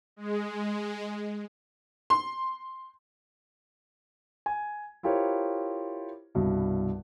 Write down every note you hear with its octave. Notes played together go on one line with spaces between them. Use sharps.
G#3
C6
G#5
E4 F4 G4 A#4 C5 C#5
C2 G2 B2